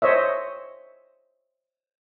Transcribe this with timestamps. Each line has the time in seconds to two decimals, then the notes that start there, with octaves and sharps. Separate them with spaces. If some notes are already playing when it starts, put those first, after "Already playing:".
0.02 C5 C#5 D#5 E5